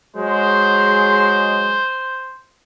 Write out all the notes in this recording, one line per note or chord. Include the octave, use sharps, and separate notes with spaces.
F#3 G#3 C5